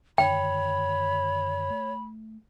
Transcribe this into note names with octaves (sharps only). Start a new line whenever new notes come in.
F#2 D3 D#3 C#5 G5 B5
A3